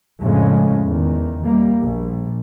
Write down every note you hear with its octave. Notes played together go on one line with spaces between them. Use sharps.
F2 A2 C#3 F3 G#3 C#4
E2 D#3
G3 A#3
A#1